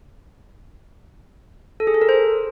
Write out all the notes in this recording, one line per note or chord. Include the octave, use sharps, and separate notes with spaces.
A4
G#4
A4
A#4
C5